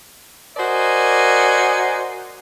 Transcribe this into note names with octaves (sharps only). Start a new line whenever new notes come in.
F#4 A#4 C5 D5 D#5 G#5